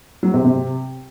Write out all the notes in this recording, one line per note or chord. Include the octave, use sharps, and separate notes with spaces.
F#3
C3
C3